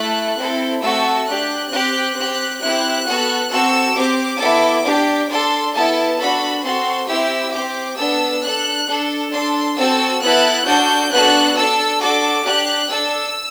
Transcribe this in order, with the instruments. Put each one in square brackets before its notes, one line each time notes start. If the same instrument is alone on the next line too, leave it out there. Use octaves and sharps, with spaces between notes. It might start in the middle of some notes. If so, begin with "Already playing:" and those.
Already playing: [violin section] A3 E4 A4 F#6
C4 E4 A4
A3 C4 F#4 A4 E6
D4 G4 F#6
C4 G4 F#6
C4 G4 F#6
C4 E4 G4 F#6
B3 F#4 A4
C4 F#4 A4 E6
C4 G4 D6
B3 E4 A4
D4 G4
D4 A4 C6
B3 E4 A4 A5
D4 F#4 A4 B5
C4 F#4 A4 C6
C4 E4 G4 E6
C4 G4 D6
B3 D4 A4 E6
D4 A4 F#6
D4 A4
D4 A4 C6
C4 F#4 A4 E6
B3 E4 A4 F#6
D4 F#4 A4 G6
B3 D4 F#4 A4 F#6
D4 A4 E6
D4 F#4 A4 D6
D4 G4 F#6
D4 A4 E6